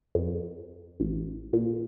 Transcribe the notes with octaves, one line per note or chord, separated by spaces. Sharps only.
F2
A1
A#2